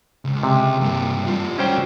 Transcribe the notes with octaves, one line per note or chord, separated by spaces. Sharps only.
C#2
C3
G2 A#3
G3 F4
C#4 F#4 C5 D5 G5